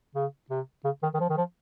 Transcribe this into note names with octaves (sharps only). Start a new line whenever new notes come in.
C#3
C3
C#3
D#3
D#3
F3
D#3
F3